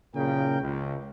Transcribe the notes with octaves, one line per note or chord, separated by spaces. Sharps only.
F#1 A#2 C#3 A#4 G5
C#2